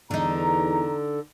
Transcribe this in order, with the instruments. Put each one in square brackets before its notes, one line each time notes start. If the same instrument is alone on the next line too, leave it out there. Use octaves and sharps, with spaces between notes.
[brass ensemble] E2 A#5 [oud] D3 D#4